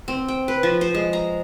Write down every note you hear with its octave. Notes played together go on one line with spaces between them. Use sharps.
C4
G5
B4
F3
C5
G#3
A#5